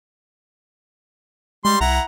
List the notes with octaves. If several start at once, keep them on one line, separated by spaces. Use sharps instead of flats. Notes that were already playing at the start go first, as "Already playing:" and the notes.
G3 G#3 C6
C2 E4 F#5 A#5